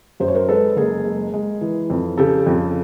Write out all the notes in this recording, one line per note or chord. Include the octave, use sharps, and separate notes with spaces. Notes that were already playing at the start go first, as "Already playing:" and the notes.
F#2 C5
C#5
A#4 C5
G#3 A4 B4
F#1 G#4 A#4
G#3
G#3
E3
F2
C#3 G4 A4
F2